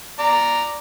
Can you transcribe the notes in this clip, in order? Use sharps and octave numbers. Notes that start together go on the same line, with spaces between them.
D5 A#5